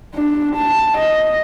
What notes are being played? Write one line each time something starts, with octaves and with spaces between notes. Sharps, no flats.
D4
A5
D#5